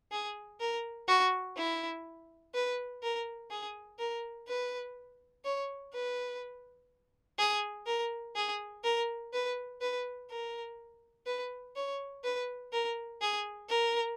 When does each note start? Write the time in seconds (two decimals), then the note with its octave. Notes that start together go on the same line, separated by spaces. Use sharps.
0.12 G#4
0.60 A#4
1.08 F#4
1.57 E4
2.55 B4
3.03 A#4
3.50 G#4
3.99 A#4
4.48 B4
5.45 C#5
5.94 B4
7.39 G#4
7.87 A#4
8.36 G#4
8.84 A#4
9.33 B4
9.81 B4
10.30 A#4
11.26 B4
11.76 C#5
12.24 B4
12.73 A#4
13.21 G#4
13.69 A#4